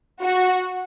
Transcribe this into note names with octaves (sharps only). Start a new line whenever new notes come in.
F#4